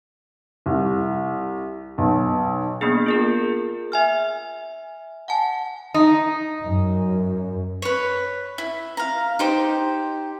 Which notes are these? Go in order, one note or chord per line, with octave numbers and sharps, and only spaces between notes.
C2
B1
A#3 B3 D4 G#4
F4 G#4 A#4
E5 G#5 F6
F#5 G#5 A5
D#4
F#2
B4 C#5
E4
F5 A#5
D#4 G4 C5